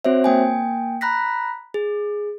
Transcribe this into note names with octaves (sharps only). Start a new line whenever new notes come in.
C4 F#4 C5 C#5 E5
A#3 G5 G#5
A#5 B5 F#6 A#6 B6
G#4